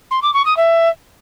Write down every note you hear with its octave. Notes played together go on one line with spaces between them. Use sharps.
C6
D6
C#6
D#6
E5